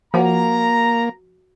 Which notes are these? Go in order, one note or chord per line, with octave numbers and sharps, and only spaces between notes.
F3 A#3 F#4 C#5 F#5 A#5